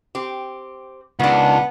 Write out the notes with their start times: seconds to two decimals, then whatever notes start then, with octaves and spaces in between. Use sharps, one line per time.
0.15 C4 G4
1.20 C#2 D#3 B3 D4